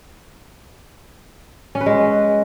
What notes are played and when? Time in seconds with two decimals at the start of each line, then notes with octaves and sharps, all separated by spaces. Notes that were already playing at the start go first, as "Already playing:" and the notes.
1.75 C#4
1.81 B4
1.86 G#3